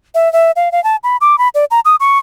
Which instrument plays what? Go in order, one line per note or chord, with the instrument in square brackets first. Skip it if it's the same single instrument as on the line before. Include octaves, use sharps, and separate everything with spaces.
[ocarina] E5
E5
F5
F5
A5
B5
D6
B5
D5
A#5
D#6
C#6